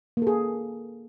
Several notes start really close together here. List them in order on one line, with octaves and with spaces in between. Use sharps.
A#3 A4 G#4